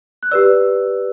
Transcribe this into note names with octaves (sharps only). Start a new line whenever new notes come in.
F#6
G4 B4 D5 E6